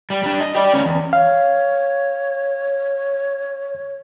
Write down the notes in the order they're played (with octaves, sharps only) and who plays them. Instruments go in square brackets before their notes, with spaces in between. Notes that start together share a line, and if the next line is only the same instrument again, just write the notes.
[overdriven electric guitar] G3
G3 D4
D#5
G4 D5
D2 C#4
E2
[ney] C#5 [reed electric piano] F5